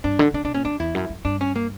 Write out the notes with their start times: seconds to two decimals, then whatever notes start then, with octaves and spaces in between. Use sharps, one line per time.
0.04 G2 D4
0.19 D3
0.34 D3 D4
0.44 B2 D4
0.54 A#2 C#4
0.65 F#2 D4
0.80 E2 E4
0.95 F#2
1.10 F#2
1.25 G2 D4
1.41 C#4
1.56 A#3